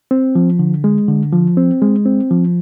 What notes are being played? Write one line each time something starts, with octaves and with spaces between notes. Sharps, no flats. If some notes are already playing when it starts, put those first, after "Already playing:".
C4
F3
D3
G#3
D3
F3
C4
G#3
C4
F3